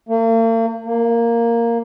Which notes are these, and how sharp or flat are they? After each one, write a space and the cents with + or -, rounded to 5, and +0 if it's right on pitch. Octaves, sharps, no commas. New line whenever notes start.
A#3 -45
A#3 -5